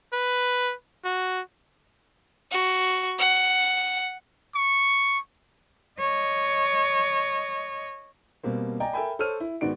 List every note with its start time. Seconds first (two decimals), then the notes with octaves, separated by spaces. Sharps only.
0.13 B4
1.05 F#4
2.52 F#4
3.19 F#5
4.55 C#6
6.00 C#5 D#5
8.44 B2 G3 A#3 C4
8.80 D5 D#5 G5 G#5 A#5
8.93 A4 A#4 E5 G5 G#5 B5
9.19 A4 C5 C#5 F6 D#7
9.40 E4
9.61 G#2 D#3 B3 F#4 D5 D7